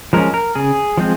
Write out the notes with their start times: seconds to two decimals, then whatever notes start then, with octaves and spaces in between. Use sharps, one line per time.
0.13 F3 G#3 C#4 A#4
0.34 A#4
0.55 C#3 G#4
0.97 F3 G#3 C4